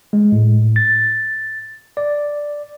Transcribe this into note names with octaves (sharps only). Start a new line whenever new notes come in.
G#3
A2
A6
D5